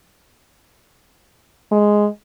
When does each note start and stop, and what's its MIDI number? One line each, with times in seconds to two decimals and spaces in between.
1.71 2.07 56